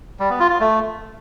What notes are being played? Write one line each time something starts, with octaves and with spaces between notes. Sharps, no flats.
G3
B3
F4
F4
A3